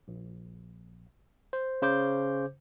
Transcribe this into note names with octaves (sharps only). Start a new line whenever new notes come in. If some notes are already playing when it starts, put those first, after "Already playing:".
A#1
C5
C#3 C5 D6 G6